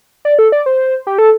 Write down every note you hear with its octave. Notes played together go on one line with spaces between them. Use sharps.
D5
A4
D5
C5
G4
A4